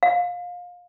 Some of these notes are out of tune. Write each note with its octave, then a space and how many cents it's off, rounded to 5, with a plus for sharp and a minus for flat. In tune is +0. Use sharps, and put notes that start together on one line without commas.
F5 +25